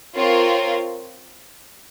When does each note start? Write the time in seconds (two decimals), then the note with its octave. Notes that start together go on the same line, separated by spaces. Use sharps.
0.16 C4 F4 A#4 C#5